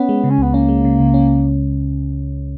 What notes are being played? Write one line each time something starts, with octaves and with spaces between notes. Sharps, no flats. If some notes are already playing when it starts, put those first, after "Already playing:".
Already playing: B3 C#4
G#3
C#3
C#4
C#2 B3
A#3 C#4
G#3
C#3
C#2
C#4